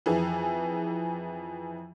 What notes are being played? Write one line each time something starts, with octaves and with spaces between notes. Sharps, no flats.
F2 E3 G#4